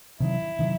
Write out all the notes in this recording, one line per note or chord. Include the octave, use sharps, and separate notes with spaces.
C3 D#3 F#3 E4
C3 D#3 F#3